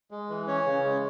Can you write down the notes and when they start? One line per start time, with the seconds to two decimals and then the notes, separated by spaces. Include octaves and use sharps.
0.11 G#3
0.29 E3
0.47 C#4 C#5
0.66 C#3
0.85 G#3